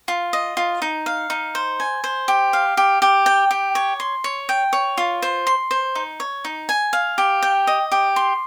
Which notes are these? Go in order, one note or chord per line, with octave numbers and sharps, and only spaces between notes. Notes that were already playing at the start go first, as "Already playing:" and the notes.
F4
D#5
F4
D#4
F5
D#4
C5
G#5
C5
G4
F5
G4
G4
G5
G4
C#5
C6
C#5
G5
C#5
F4
C5
C6
C5
D#4
C#5
D#4
G#5
F5
G4
G5
D#5
G4
C6